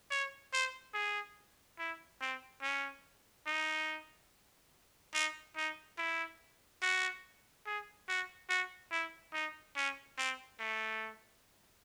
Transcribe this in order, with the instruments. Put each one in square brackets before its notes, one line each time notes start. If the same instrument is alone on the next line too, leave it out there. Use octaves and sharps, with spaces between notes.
[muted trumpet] C#5
C5
G#4
E4
C4
C#4
D#4
D#4
D#4
E4
F#4
G#4
F#4
F#4
E4
D#4
C#4
C4
A3